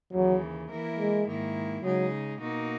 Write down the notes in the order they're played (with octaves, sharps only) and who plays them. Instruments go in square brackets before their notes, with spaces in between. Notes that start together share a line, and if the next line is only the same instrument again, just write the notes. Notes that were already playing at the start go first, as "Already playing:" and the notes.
[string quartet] D#2 C#3 E3 [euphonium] F#3
[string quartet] E3 A#3 E4 A#4
[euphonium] G#3
[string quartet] G#2 D#3 A#3 E4
[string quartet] C#3 G#3 D#4 G#4 [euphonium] F#3
[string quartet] B2 A#3 D#4 F#4